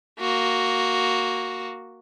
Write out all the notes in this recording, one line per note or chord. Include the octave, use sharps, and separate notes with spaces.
A#3 F#4